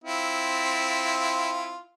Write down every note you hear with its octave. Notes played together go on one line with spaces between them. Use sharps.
C4 E4 F4